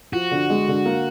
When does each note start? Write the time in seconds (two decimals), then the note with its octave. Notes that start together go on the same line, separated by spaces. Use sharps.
0.13 F3 F#4
0.31 D3
0.49 G#3
0.68 D3
0.86 A#3